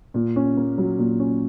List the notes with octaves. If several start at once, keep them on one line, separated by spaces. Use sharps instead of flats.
A#2
C#4
A#3
F#3
A#2
C#4